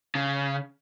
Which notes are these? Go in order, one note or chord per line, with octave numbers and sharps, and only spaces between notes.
C#3